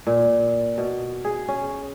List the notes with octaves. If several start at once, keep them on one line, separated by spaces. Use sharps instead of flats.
A#2
B2
G#4
C#4